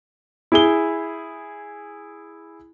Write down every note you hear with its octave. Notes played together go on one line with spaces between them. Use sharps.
E4 G#4 G7